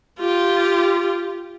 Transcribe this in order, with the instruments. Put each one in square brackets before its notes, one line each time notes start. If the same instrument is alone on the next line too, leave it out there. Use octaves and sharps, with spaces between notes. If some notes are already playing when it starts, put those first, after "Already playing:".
[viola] F4 G4